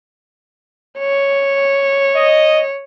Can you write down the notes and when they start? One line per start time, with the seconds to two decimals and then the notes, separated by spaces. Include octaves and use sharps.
0.99 C#5
2.15 D#5